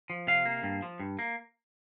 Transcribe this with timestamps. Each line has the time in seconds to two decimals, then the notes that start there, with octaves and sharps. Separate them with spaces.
0.10 F3
0.27 C3 F5
0.45 A#3
0.63 G2
0.82 F3
1.00 G2
1.19 A#3